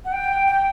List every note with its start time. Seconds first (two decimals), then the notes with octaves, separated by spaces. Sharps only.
0.05 F#5
0.12 G5
0.47 G5